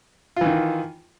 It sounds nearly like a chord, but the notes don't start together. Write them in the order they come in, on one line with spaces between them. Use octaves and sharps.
F4 E3 D#3